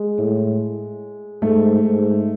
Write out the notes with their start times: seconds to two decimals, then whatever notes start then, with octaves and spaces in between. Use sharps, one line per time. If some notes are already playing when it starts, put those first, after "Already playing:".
Already playing: G#3
0.18 A2
1.42 G#2 A3
1.83 G#2